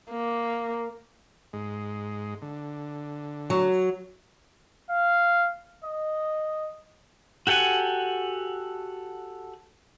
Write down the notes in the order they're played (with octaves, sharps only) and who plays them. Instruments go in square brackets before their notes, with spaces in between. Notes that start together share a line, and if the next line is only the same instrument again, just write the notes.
[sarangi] A#3
[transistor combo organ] G#2 G#3
D3
[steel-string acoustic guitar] F#3
[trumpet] F5
D#5
[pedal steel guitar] F#4 G4 A4 F#5 G#5